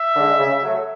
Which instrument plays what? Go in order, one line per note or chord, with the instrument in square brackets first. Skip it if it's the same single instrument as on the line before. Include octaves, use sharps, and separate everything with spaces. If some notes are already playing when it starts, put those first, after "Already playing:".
Already playing: [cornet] E5
[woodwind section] D3 G#3
C#3
F#3 A3